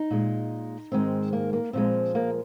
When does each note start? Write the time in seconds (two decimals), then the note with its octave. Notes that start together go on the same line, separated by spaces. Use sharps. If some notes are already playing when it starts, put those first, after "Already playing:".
Already playing: D#4
0.11 A#2 G#3
0.92 G#2 D#3 G#3 C4
1.33 A#3
1.53 A#3
1.73 A#2 F3 G#3 C4
2.15 A#3